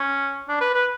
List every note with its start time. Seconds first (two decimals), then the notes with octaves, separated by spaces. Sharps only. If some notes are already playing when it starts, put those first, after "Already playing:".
Already playing: C#4
0.49 D4
0.61 B4
0.74 B4